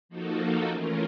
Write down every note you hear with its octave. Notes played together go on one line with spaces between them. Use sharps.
F3 A#3 D#4 F#4 A4
E3 A3 C#4 F4 A#4